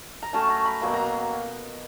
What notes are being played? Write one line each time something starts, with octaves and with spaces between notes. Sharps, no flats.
A#5
F#3 A3 C#4 A5
A#5
B5
B2 F#3 A#3 A#5
A#5